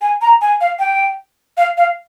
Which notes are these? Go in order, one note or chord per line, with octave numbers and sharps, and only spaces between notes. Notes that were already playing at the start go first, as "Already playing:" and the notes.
G#5
A#5
G#5
F5
G5
F5
F5